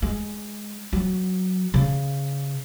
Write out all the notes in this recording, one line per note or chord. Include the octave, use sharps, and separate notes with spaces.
G#3
F#3
C#3